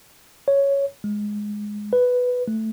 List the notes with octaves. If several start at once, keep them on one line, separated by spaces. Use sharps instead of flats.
C#5
G#3
B4
A3